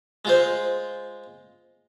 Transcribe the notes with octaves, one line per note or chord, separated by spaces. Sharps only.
G#3 F4 C5